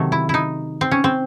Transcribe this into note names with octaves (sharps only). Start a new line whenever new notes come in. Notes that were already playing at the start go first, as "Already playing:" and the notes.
Already playing: C3 D#3 F#3 A3
E4
D#4 E4
C4
C#4
C4